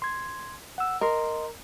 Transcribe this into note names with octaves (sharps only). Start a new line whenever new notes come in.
C6 G#6
F#5 E6
A#4 D#5 C6